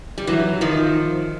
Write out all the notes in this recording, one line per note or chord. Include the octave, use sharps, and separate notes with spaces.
G3
E3 F#3
D#3 F3